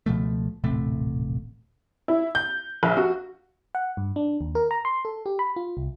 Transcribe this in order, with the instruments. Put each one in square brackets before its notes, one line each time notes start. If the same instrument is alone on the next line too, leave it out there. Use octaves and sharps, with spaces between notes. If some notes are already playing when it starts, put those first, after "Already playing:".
[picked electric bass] C#2 B2 F3 A3
D#1 A1 C3 A3
[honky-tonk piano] E4
G6
A#1
F#4
[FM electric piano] F#5
G2
D4
D#2
A#4
A#5
C6
A4
G4
B5
F4
C2